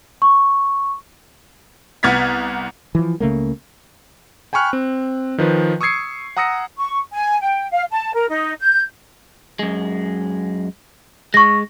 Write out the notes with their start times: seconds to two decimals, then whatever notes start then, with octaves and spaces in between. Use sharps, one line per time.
0.22 C#6
2.03 C2 B3 F6 G#6 A6 B6
2.95 E3 F3
3.20 C#2 C#3 A3 A#3
4.53 G5 G#5 B5 C#6 F6 F#6
4.73 C4
5.38 D#3 F3 B4
5.81 C#6 D#6 E6 G#6 C7 C#7
6.37 F#5 A#5 D#6 E6 A#6 C#7
6.76 C#6
7.12 G#5
7.41 G5
7.71 F5
7.90 A5
8.13 A#4
8.27 D#4
8.60 G6
9.59 F#2 G#3
11.34 G#3 C#6 A#6